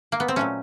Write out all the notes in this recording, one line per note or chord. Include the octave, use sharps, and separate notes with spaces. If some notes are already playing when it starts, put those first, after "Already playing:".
A#3
B3
C4
A#2 F#3 A3 C#4